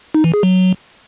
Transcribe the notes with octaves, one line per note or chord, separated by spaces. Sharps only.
D#4
E3
G#4
F#3